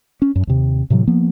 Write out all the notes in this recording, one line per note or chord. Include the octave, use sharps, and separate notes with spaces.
C#4
F#2
D#2 C3
A2 C3 E3 F#3
F3 A#3 B3